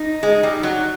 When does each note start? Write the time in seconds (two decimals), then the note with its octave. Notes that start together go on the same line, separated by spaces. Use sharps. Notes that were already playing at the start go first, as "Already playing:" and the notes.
Already playing: D#4
0.23 G#3
0.43 G3
0.63 F#3